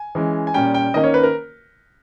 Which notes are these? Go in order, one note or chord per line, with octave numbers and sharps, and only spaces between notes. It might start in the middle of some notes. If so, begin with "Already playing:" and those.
Already playing: G#5
E3 G#3 C#4
G#5
A#2 G3 C#4 G5
G5
D#3 A#3 C#4 D#5
C#5
B4
A#4